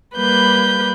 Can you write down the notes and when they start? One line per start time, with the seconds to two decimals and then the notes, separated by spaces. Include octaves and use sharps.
0.16 G3 A#3 B4 B5 G6